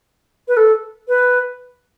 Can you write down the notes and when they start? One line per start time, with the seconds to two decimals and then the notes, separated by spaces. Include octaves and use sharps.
0.48 B4
0.57 A4
1.08 B4